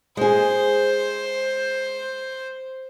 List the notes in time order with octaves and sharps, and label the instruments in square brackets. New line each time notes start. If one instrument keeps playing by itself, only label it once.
[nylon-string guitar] G#3 G#4 [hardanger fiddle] C5